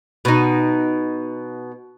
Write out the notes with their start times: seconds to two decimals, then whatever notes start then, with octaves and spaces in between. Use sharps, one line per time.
0.25 B2 D#4